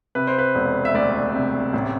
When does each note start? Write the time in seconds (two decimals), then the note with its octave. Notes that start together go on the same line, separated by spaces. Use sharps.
0.15 C3 B4
0.27 C5
0.39 B4
0.55 E1
0.85 E5
0.94 D2 D5
1.34 C3
1.73 A1